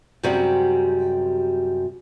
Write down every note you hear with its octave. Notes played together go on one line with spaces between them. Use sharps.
F#2 C3 G3 G#3 C4 F#4